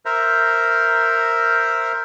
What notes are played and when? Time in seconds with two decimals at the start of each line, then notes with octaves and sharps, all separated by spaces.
0.06 A#4 C5 E5 A#5